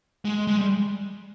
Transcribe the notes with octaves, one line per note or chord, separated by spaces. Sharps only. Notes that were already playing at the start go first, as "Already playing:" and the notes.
G#3
G#3
G3